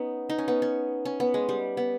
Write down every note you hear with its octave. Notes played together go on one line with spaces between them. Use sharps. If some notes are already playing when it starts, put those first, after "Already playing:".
Already playing: B3 C#4 D#4
D#4
C#4
B3
C#4
C#4
B3
G#3
G3
B3